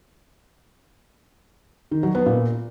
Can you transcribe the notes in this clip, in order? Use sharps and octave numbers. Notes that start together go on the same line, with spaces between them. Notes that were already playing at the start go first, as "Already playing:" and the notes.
D#3
F#3
B3
A#2